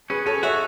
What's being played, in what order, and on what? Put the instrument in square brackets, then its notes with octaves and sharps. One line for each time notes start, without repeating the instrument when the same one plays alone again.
[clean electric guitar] C#4 [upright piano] G#4 B4
[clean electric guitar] C#4 [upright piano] A4 C#5
[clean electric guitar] F#4 [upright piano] C#5 E5